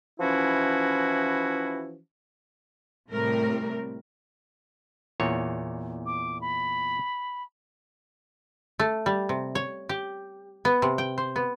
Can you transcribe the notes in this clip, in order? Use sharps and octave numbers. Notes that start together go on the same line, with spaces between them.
E3 F3 C#4 E4 F#4
A2 C3 G3 A3 C4 A#4
E2 A#2 C#5
D6
B5
A3
G3
C3
C#5
G4
B3
C3
G5
C5
B3